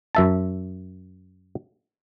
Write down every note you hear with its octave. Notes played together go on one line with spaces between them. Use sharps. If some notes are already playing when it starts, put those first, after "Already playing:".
F#2 E5 A5